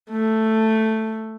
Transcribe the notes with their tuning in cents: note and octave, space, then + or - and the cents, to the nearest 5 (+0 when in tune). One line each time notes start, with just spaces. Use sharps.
A3 +5